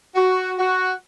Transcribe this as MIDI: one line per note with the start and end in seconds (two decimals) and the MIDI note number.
0.15 0.53 66
0.58 0.94 66